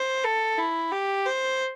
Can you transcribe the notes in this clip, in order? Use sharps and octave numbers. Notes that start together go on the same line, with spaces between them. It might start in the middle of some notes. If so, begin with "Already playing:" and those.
Already playing: C5
A4
E4
G4
C5